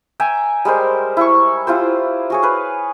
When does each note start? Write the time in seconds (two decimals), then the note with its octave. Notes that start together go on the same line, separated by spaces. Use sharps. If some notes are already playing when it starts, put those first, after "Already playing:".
0.20 E5 G5 G#5 A#5
0.65 G3 G#3 A#4 C5
1.17 E4 C#6
1.67 E4 F4 G4 C5
2.30 F#4 G#4 C#5
2.43 B4 F5